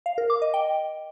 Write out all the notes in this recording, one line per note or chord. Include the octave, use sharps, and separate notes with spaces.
F5
A#4
D6
D#5
G5